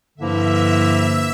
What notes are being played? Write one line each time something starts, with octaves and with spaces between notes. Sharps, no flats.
G2 D3 F3 A#3 E4 E5